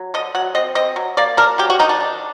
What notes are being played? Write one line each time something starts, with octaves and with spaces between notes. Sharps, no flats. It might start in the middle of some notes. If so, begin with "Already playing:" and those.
Already playing: F#3
D3 D#5
F#3 F#5
C4 D#5
C4 D#5
F#3
A#3 D5
D4 A#4
F#3 G4
F#4
D#3 D#4
D4
D4